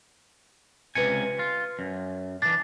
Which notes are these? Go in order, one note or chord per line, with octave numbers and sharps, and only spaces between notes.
C#2 C3 B4 G#5 C#7
F4
F#2
E3 D4 A6